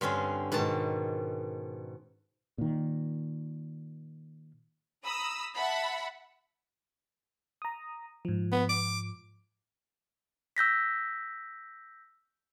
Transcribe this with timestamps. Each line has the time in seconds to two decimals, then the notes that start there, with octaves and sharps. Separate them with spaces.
0.01 G2 D3 C4 C#4
0.52 G#2 B2 D#3 A5
2.58 A#2 D#3
5.05 A#5 B5 D#6 E6
5.57 E5 F#5 A5 B5
7.62 A#5 D#6
8.25 G#2 F3
8.52 B3
8.69 D6
10.57 E6 G6 A#6 B6